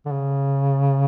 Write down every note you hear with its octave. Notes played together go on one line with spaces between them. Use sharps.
D3
C#3